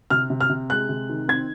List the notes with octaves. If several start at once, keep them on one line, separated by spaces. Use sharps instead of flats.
C3 F6
C3
F6
C3
G#3 F#6
C3
D#3
C4 G#6